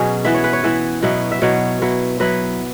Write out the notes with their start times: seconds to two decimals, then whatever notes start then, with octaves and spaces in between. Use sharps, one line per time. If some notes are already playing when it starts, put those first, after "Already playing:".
Already playing: B2 F#3 C#4 G#4
0.25 E3 B3 E4 E5
0.34 C#5
0.44 B4
0.53 C#5
0.64 E3 B3 E4 E5
1.03 B2 F#3 B3 E4
1.32 E5
1.42 B2 F#3 B3 E4 C#5
1.82 F#3 B3 E4
2.20 F#3 B3 E4 B4